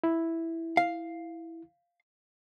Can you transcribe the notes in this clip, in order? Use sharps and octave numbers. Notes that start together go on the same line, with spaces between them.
E4
F5